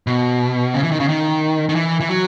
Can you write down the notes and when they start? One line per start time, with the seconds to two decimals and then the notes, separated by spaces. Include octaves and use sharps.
0.07 B2
0.74 C#3
0.83 E3
0.92 D#3
1.00 C#3
1.08 D#3
1.69 D#3
1.75 E3
2.00 E3
2.09 F#3